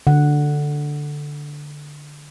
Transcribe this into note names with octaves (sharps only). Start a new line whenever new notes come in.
D3 F#5